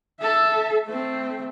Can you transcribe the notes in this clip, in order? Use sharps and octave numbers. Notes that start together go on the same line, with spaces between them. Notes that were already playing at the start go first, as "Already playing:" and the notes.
A4 E5
A3 C4